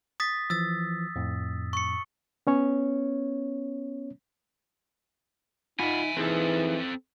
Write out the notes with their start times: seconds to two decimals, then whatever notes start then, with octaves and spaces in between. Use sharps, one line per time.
0.20 D#6 A6 B6
0.50 E3 F3 E6 A6
1.16 F2 A2
1.73 C#6 C#7
2.47 B3 C#4 C#5
5.80 D#4 F4 E5 F#5 G#5 B5
6.17 E3 C4 D#4 G#4 A4 B4